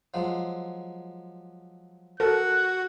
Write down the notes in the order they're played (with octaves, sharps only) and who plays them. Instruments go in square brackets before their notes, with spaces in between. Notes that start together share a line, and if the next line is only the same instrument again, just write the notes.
[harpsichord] F3 F#3 G#3
[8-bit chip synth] F#4 [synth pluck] A4 A#4 [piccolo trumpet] F#6